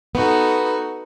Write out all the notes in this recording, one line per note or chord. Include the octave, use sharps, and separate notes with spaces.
B3 D#4 F#4 A4